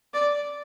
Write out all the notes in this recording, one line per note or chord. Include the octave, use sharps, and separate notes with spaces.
D5